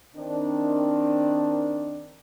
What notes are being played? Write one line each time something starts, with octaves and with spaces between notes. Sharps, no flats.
D#3 C4 D4